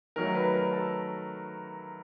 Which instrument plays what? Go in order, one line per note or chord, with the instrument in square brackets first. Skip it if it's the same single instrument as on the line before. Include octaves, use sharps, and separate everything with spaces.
[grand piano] D#3 F#3 A3 A#4
B4
A#4
A4